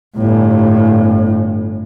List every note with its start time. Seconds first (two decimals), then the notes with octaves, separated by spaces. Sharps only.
0.16 G1 A2